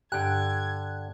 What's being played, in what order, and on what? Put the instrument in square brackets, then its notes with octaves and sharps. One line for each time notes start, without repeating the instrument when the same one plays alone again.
[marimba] G2 [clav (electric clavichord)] D3 G5 [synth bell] F#6 [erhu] G#6